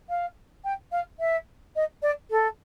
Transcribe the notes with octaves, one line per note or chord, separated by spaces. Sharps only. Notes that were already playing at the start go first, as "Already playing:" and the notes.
F5
G5
F5
E5
D#5
D5
A4